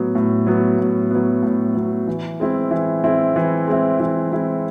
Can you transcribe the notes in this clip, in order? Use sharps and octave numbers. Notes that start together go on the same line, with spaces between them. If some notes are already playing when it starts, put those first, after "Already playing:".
Already playing: A2 F#3 B3
A2
F#3 B3
A2
F#3 B3
A2
F#3 B3
E3
G#3 C4 E4
E3
G#3 C4 E4
E3
G#3 C4 E4
E3
G#3 C4 E4